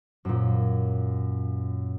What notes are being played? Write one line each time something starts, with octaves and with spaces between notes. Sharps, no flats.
F#2 A#2